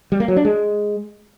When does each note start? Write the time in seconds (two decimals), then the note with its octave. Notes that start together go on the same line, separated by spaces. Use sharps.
0.12 G3
0.20 A#3
0.28 F#3
0.37 D4
0.45 G#3